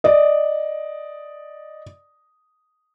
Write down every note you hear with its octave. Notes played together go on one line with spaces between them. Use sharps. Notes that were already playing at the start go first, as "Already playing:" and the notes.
D5 D#5